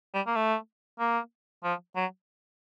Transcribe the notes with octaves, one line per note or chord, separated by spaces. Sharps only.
G3
A#3
A3
A#3
F3
F#3